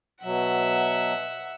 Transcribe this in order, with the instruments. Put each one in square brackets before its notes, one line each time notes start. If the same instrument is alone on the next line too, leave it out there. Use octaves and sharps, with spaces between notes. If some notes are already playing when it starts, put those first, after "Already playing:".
[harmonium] B2 F#3 [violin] E5 F#5